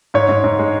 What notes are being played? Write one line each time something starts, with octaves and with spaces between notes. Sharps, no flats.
G#2 C#5
G#2
G#2
G#3